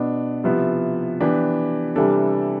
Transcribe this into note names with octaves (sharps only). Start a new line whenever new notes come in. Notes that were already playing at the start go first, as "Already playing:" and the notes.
Already playing: B2 B3 D4
C3 F3 B3 E4
E3 B3 D4 G4
C3 E3 G3 D4 A4